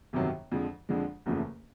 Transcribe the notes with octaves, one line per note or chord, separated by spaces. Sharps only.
G1 F2 C3 D#3 F#3
F2 D3 F3 G#3
F2 D3 F3 G#3
F#1 E2 C#3 F3 A3